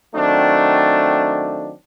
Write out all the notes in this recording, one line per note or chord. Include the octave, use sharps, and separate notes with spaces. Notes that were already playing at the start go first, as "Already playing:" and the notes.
D#3 F#3 A3 C4 D4